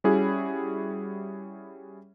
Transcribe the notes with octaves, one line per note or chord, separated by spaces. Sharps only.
G3 C#4 E4 F#4 G#4